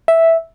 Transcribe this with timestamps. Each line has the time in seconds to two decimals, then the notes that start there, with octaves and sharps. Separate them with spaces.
0.08 E5